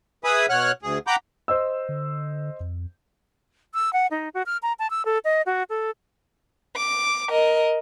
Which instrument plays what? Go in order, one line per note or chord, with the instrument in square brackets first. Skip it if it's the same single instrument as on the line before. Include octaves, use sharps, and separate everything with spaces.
[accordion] G#4 B4 E5 G#5 B5 D#6
B2 C#5 F#5 F6 F#6
D2 G#4
F#5 G5 A#5 B5 D6 G6
[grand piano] C5 D#5 E6
[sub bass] D3
F2
[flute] E6
F#5
D#4
F#4
F6
A#5
A5
E6
A4
D#5
F#4
A4
[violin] D6
A#4 D#5